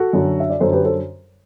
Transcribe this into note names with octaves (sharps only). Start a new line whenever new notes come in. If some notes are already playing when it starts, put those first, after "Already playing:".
Already playing: F#4 A4
F#2 D3
E5
D5
F#2 D3 A4 C5
G4 B4
A4 C5